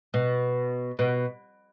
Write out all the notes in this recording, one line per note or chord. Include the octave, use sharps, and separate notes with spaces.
B2
B2